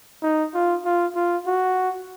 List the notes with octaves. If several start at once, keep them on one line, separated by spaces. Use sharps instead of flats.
D#4
F4
F4
F4
F#4